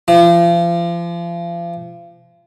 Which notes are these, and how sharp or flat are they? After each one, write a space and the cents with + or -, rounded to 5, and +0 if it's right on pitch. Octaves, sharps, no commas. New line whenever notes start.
F3 -35